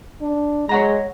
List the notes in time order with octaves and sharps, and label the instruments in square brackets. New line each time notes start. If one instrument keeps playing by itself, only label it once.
[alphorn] D4
[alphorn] G#3 [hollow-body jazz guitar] C#5 F#5 A#5